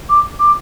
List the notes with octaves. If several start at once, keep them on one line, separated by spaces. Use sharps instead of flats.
D6
D6